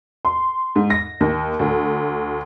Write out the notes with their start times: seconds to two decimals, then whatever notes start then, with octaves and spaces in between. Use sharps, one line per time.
0.25 C6
0.76 G#2
0.90 A#6
1.21 D#2
1.59 D2